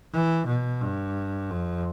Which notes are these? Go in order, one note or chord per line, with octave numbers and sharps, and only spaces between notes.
E3
B2
G2
F2